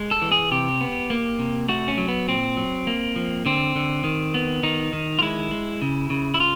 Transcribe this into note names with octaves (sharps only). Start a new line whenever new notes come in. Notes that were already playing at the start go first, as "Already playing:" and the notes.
Already playing: G#3
A4
E3
G#4
C3 G4
B3
A#3
C3
A3 F#4
C#4
F#3
B3
A#2 C4
F#3
A#3
F3
D3 C4
D3
D#3
B3
D#3 D#4
D#3
F4
G#3 E4
G#3
C#3
C#3
E4
F4